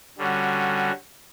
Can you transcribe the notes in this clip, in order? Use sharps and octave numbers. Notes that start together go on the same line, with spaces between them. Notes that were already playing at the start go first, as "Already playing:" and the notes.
D3 G3 C#4 F#4